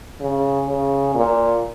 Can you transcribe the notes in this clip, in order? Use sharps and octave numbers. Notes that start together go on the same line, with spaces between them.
C#3
C#3
A#2